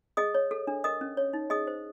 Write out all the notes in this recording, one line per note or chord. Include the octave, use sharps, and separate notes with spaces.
G#4 D#5 D#6
C#5
A4
D4
A#4 D#5 D#6
C#4
C#5
D#4
G#4 D#5 D#6
C5